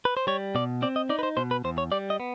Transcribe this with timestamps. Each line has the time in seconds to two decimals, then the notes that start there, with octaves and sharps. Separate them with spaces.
0.05 B4
0.17 C5
0.27 G3 C#5
0.55 B2 D5
0.82 C4 D5
0.96 D#5
1.09 D#4 D5
1.19 B4
1.23 C5
1.37 B2 C5
1.51 B4
1.64 E2 C5
1.78 C#5
1.92 G3 D5
2.10 D#5
2.20 B3